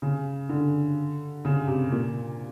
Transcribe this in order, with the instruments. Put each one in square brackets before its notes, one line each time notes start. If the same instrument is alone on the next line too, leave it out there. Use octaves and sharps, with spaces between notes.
[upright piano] C#3
D3
C#3
C3
A#2